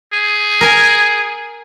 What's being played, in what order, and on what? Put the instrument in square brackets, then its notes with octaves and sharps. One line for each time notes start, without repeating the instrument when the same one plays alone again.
[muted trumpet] G#4
[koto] A#4 G#5